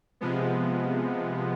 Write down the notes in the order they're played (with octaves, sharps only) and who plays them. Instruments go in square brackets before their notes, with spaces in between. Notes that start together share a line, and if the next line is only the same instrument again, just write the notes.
[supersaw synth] C3 F3 G#3 B3